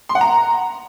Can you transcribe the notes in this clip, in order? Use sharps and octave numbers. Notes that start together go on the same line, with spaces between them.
C6
F#5
A#5